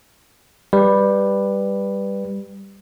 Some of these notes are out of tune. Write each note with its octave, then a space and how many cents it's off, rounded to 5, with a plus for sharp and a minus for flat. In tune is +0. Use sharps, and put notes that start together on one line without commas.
G3 +10 B4 +0